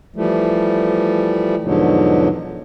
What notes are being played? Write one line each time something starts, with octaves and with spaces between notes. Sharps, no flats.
E3 F3 G3 A3
E2 G#2 B2 D3 F3 F#3